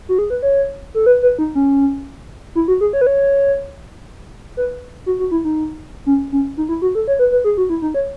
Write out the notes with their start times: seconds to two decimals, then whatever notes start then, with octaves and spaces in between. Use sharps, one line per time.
0.09 F#4
0.19 G#4
0.30 B4
0.43 C#5
0.95 A4
1.06 B4
1.23 B4
1.39 D#4
1.55 C#4
2.55 E4
2.68 F#4
2.81 G#4
2.93 C#5
3.01 B4
3.07 C#5
4.57 B4
5.06 F#4
5.19 F#4
5.31 E4
5.45 D#4
6.06 C#4
6.32 C#4
6.57 D#4
6.69 E4
6.82 F#4
6.95 A4
7.08 C#5
7.19 B4
7.32 B4
7.44 G#4
7.58 F#4
7.70 E4
7.82 D#4
7.94 C#5